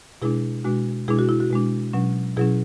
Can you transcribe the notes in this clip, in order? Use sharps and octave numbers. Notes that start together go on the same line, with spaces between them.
B2 G#3 D4 E4 G#4
B2 G#3 D4 F#4
B2 G#3 D4 E4 G#4
F#4
E4
F#4
B2 G#3 D4
B2 F#3 C#4
B2 F#3 C#4 E4 G#4